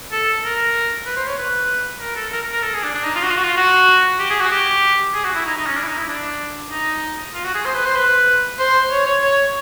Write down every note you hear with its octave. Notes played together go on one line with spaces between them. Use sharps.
A4
A#4
B4
C5
C#5
B4
A#4
A4
A#4
A#4
A4
G#4
D4
D4
D#4
F4
F#4
F4
F#4
F4
F#4
G4
G#4
F#4
G4
G#4
F#4
E4
D#4
D#4
C#4
D4
E4
D#4
E4
D4
D#4
F4
F#4
G#4
C5
B4
C5
B4
C5
C#5
C#5
C#5